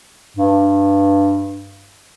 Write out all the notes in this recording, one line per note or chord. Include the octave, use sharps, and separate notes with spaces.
G2